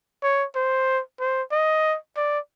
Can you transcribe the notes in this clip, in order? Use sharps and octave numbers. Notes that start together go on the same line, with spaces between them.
C#5
C5
C5
D#5
D5